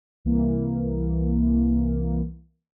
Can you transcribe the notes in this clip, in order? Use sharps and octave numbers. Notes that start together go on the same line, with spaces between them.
C2 E3 A#3